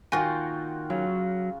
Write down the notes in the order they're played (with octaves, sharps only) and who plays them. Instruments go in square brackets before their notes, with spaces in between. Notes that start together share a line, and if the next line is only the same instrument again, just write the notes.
[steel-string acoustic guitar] A#2 D#3 [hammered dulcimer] F4 F#4 G5 [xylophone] G#5
[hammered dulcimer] C#3 [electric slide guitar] F#3